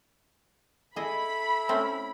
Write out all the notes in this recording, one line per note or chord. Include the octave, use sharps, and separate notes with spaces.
E4 G#4 A4 D#5 B5
A3 C4 C#4